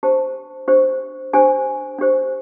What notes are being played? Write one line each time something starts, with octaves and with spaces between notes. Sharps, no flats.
D4 G4 C5 A5
D4 G4 C5
D4 G4 C5 G#5
D4 G4 C5